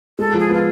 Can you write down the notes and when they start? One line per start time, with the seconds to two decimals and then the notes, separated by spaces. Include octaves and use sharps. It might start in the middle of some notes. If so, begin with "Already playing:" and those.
0.19 G#3 A4
0.34 F3
0.40 G#4
0.49 B3 F4